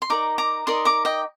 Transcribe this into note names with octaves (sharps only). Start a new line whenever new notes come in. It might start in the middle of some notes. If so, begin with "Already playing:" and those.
C6
D#4 A#4 D5 A#5 D6
A#5 D6
D#4 A#4 D5 C6 D#6
A#5 D6
D#5 G5